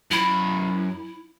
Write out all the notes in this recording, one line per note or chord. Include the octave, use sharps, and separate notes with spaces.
F#2 E4 B5